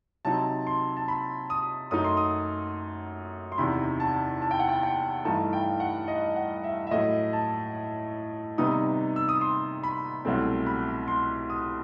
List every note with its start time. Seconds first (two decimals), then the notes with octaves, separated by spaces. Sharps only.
0.25 C3 F#3 C4 D#4 A5
0.67 C6
0.97 A5
1.08 B5
1.50 D#6
1.91 F#2 F#3 A3 D#4 D#6
2.04 C6
2.17 D#6
3.52 C6
3.58 E2 C3 D#3 B5
4.00 A5
4.42 A5
4.51 G5
4.59 F#5
4.69 G5
4.83 G5
5.25 G2 E3 A3 D#4 A5
5.53 G5
5.80 F#5
6.08 D#5
6.36 F#5
6.64 E5
6.87 E5
6.91 A2 F#3 A3 D#5
7.33 A5
8.58 C3 D#3 G3 B3 D#4 D#6
9.16 E6
9.29 D#6
9.41 C6
9.83 B5
10.25 C2 B2 F#3 A3 C4
10.66 B5
11.08 C6
11.50 D#6